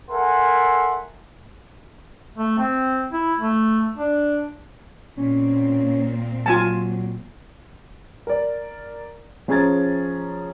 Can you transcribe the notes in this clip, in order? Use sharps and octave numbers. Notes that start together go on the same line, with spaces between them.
A4 A#4 E5 F#5 G#5 C6
A3
C4
E4
A3
D4
A#2 C4 C#4
F#3 F4 G#5 A5
A#4 D5
F3 C#4 G#4 A#5 G#6 A6